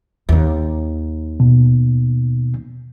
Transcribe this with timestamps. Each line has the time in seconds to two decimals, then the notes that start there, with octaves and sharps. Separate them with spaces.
0.29 D#2 D#3
1.40 B2